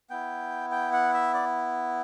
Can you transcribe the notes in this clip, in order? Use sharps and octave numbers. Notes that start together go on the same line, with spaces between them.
B3 E4 G5
G5
F#5
E5
D5